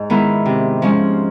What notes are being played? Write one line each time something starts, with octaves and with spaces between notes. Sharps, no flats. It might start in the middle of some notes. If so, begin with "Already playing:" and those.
Already playing: G#2
D#3 G#3 B3 E4
C3
F3 G#3 C#4